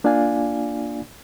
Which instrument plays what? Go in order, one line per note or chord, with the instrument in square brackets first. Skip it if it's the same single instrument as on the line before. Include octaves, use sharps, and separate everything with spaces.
[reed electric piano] A#3 D4 F4 D5 F5 G#5